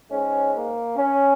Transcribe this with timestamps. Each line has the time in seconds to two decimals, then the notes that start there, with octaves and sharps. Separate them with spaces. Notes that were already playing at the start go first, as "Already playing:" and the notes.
0.10 G#2 G#3 C#4
0.54 A#3
0.97 C#4